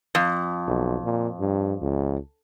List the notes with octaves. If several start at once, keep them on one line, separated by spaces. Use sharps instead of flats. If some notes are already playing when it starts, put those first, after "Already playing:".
F2
B1
A#2
G2
C#2